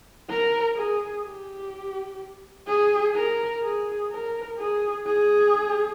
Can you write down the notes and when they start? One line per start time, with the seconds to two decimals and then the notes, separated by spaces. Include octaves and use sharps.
0.29 A#4
0.76 G#4
1.25 G4
2.67 G#4
3.15 A#4
3.63 G#4
4.11 A#4
4.58 G#4
5.06 G#4